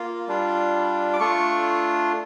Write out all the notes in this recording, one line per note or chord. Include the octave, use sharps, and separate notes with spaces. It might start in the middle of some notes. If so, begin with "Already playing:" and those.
Already playing: A#3 F4
G3 D4 F4
D6
A3 D4 F4 C#6